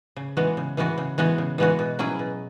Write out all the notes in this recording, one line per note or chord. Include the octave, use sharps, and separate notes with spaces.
C#3
E3 G#3 B3 F#4
C#3
E3 G#3 B3 F#4
C#3
E3 G#3 B3 F#4
C#3
E3 G#3 B3 F#4
B2
F#3 C#4 E4 G#4
B2